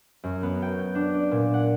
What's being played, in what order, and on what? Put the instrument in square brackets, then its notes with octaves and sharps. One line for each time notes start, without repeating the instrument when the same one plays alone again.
[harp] F#2
B3
G5
G6
D4
D5
A#2
F#5